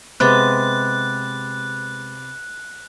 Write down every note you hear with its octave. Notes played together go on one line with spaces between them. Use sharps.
C3 G#3 B3 B5 D6 F#6 A6